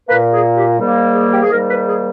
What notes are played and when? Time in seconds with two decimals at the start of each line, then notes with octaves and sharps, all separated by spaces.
0.08 A#2 A#3 B4
0.32 G#4
0.56 G4
0.79 G#2 D#3 G3 A#3
1.15 G#4
1.33 G4
1.43 G#4
1.50 G#2 D#3 G3 A#3 A#4
1.68 B4
1.86 G#4